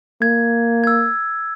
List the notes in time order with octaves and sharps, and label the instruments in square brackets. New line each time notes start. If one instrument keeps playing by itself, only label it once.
[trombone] A#3 [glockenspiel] G#6
[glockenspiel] E6 G#6